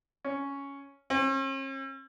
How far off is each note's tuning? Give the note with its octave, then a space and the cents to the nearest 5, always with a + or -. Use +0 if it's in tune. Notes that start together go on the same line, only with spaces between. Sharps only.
C#4 +5
C#4 -45